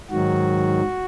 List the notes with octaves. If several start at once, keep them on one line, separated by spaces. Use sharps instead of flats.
G#2 D#3 F#3 F#4